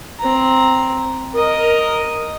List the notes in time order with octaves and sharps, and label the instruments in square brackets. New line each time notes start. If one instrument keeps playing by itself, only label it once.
[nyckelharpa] C4 A#5
[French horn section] A#4 [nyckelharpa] D#5